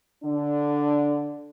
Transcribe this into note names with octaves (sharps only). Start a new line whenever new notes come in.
D3 D4